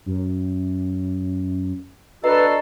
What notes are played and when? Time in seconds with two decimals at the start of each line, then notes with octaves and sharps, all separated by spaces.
0.06 F#2
2.24 D4 F#4 A4 B4 D#5 A#5 C7